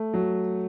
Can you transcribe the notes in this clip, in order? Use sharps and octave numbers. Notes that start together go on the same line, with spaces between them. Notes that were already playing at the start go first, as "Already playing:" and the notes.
Already playing: A3
F#3